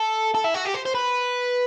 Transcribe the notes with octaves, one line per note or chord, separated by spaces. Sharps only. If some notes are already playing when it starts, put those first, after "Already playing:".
Already playing: A4
A4
E4
F#4
G4
C5
C5
B4